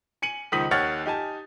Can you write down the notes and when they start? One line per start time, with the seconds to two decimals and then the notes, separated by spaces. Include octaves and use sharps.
0.22 G#5 C#7 D#7 F#7
0.52 C#2 D#3 F3 D#6 B6 F#7
0.71 D#2 D#3 C#5 F#5 F6 A6
1.06 D#4 G4 G#5 A5